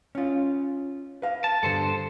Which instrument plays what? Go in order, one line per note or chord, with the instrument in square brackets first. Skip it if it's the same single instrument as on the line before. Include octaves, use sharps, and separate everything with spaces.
[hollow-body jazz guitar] C#4 F4
B4 F5
[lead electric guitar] A5
[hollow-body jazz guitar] G2 D3 [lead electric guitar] A4 C5